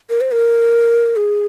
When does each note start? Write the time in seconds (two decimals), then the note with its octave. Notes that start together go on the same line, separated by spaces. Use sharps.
0.10 A#4
0.21 C5
0.32 A#4
1.16 G#4